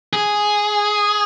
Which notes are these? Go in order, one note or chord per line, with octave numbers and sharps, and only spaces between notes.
G#4